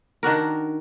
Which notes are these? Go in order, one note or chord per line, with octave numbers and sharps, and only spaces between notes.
D#3 D4 F#4 A#4